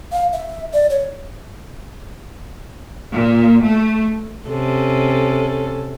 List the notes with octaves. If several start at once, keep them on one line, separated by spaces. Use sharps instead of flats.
F5
E5
D5
C#5
A#2
A3
C3 C#4 A4